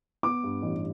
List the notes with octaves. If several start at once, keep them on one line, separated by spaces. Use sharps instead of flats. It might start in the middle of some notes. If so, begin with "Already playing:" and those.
B3 D6
G2
A1